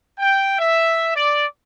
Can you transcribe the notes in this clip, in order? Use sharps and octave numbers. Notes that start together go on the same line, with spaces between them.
G5
E5
D5